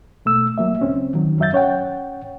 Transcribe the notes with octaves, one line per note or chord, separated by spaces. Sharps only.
B2 A3 E6
F#3 A#3 E5
C#2 C4 C#4
D#3 F#3
F#2 F#3 E5 F5 G6 A6
C#4 C#5 F#5 G5